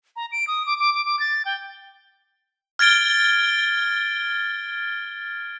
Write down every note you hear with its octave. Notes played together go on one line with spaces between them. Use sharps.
A#5
D7
D#6
D6
D6
D6
D6
A6
G5
F6 G#6 A6 D7 G7